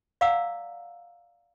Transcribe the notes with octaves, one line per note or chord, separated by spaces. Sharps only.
D5 F5 F#5 A#5 D6 E6